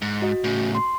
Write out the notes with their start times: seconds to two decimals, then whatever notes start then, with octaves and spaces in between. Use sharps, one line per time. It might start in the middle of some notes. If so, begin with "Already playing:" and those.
0.02 G#2
0.22 F#4 D#5
0.44 A2 C#3
0.75 C6